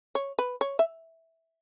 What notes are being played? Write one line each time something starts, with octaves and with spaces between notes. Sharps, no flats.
C#5
B4
C#5
E5